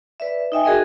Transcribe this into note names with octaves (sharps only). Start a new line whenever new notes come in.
B4 D5 E5
D#4 D#5 E5 G5 G#5
F#4 G#4 A#4 D#5